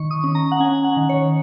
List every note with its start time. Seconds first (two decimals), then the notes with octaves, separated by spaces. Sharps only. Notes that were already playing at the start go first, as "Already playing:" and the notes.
Already playing: D#3 C#6
0.11 D#6
0.24 C#4
0.35 A#5
0.52 F#5
0.60 C#4 G#5
0.84 F#5
0.97 D#3
1.09 C#5